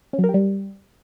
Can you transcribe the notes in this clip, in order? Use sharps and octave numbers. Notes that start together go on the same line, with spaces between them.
C#4
F#3
A#4
G4
G3